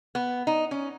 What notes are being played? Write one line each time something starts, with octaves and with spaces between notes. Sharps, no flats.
B3
D#4
C#4